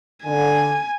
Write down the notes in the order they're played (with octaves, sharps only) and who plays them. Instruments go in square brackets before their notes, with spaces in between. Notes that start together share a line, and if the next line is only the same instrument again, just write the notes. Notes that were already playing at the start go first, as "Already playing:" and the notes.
[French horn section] D3 [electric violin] G#5